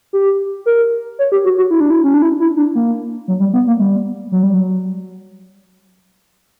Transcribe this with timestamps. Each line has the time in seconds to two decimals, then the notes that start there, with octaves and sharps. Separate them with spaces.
0.13 G4
0.66 A#4
1.19 C#5
1.32 G4
1.45 F#4
1.57 F#4
1.70 E4
1.80 D4
1.90 E4
2.04 C#4
2.14 D4
2.22 E4
2.40 E4
2.57 D4
2.75 A#3
3.28 F#3
3.40 G3
3.53 B3
3.67 A#3
3.80 G3
4.32 F#3
4.43 G3
4.54 F#3